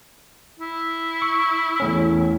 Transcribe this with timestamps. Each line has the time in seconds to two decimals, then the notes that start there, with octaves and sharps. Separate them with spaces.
0.60 E4
1.22 C#6
1.80 E2 A2 C#4